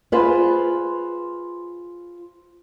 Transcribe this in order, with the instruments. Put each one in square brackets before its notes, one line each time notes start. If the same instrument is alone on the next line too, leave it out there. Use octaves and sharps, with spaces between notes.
[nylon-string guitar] F4 G#4 B4 C5 D5 F5